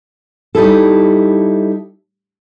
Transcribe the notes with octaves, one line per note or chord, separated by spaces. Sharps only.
G3 D#4 E4 A4